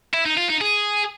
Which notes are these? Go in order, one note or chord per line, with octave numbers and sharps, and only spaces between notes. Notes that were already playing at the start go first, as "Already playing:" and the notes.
E4
D#4
F4
D#4
G#4